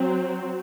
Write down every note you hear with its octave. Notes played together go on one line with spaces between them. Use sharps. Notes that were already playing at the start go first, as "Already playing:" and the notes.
Already playing: F#3 C4